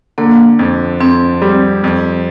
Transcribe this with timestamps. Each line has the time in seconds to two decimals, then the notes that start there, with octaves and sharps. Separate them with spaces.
0.18 D3 A#3
0.59 F2
1.00 F2 C4
1.42 G3
1.84 F2